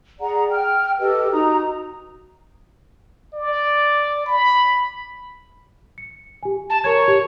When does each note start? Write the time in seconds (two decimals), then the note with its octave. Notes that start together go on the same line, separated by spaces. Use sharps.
0.20 G#4 D5 F#5 A#5
0.50 G5 F6
1.00 G4 A4 B4 D#5
1.31 D#4 F#4 A#5 D#6
3.33 D5
4.26 B5
5.98 C#7
6.43 G4 G#5
6.70 A5
6.84 A#4 C#5 A#5 G#6
7.08 G4